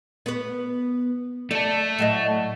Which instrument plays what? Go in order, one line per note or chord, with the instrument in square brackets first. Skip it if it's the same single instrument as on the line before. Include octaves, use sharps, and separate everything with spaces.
[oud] B3 B4
[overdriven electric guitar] A3 A4 [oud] D5
[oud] A2 F#3 D#5